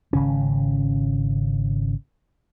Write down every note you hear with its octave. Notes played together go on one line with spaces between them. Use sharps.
G#1 C#3 C#4